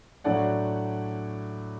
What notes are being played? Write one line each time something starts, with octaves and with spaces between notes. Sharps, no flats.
A2 F#3 A3 D4 D5 F#5